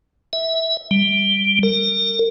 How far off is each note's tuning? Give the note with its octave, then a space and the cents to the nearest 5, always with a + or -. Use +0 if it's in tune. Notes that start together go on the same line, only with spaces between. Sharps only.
E5 -15
G3 +10
A#4 -35